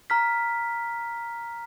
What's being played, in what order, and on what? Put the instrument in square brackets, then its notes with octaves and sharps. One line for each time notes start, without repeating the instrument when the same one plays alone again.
[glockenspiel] A#5 F6 B6